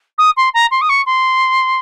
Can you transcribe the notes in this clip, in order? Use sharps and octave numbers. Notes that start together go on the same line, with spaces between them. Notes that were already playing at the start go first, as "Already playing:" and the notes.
D#6
C6
A#5
C6
D#6
C#6
C6